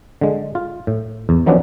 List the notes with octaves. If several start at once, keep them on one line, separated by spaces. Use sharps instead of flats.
D3 G#3
F4
A2
E2
D#3 F3 F#3 B3 C#4 D4